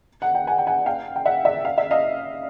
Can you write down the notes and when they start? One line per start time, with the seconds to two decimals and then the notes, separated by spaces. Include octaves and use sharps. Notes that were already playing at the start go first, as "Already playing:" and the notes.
0.22 F#5
0.35 G5
0.47 F#5 G#5
0.58 G5
0.67 F#5 G#5
0.86 F5 G5
1.16 G5
1.25 E5 F#5
1.45 D5 E5
1.65 F5
1.78 E5
1.91 D#5 F5